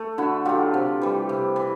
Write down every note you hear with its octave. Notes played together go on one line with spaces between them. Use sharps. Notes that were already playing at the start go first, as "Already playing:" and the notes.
Already playing: A3
D3 E4 F#4
F#3 A3 F4 G4
C3
E3 G3
C3
E3